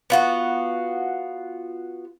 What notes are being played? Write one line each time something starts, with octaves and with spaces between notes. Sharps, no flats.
B3 F4 F#4